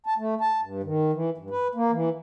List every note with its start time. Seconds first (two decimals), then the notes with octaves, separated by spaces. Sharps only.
0.06 A5
0.18 A3
0.41 A5
0.61 G2
0.83 D#3
1.13 E3
1.38 G2
1.50 B4
1.75 A#3
1.91 E3